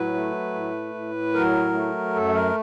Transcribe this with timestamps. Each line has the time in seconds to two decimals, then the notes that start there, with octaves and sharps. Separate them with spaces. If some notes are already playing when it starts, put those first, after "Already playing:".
Already playing: A2 F#3 B4
0.14 A3
0.54 A2
0.94 A2
1.34 F#3 A#4
1.74 A3
2.14 F#2 A4
2.34 A#4